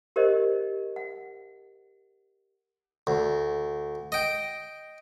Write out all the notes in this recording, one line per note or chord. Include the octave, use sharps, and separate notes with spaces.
G4 A#4 C5 D5 D#5
F#5
D2
D#5 G5